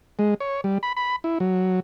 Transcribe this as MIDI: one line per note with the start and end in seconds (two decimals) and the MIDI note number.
0.19 0.34 56
0.40 0.61 73
0.64 0.78 55
0.83 0.93 83
0.97 1.16 83
1.24 1.38 64
1.40 1.80 54